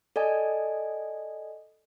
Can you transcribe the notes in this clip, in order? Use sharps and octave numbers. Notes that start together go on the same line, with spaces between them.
A4 D5 D#5 G#5